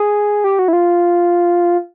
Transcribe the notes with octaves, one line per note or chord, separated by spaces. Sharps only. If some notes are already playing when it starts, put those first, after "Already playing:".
Already playing: G#4
G4
F#4
E4
F4